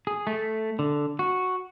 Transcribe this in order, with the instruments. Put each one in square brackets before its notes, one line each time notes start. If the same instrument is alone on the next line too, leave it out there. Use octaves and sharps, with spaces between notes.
[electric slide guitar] G#4
A3
D3
F#4